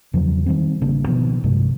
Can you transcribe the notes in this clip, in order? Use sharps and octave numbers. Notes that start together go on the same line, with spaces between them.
E2 C#3 F3 F#3
D#3 E3 G3 C4
G#1 C#3 A#3 D4
B2 D#3 F3 B3
A#1 G2 C3 G#3